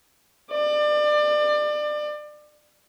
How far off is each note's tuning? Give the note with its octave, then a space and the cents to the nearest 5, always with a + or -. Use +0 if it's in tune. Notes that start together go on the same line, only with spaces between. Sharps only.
D5 +30